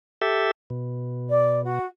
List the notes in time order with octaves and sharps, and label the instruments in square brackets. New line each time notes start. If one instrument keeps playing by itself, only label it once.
[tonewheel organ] G4 A4 E5
B2
[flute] D5
F#4